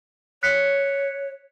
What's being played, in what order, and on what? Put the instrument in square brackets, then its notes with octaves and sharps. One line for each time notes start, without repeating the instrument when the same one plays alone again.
[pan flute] C#5 [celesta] F#6 B6 C#7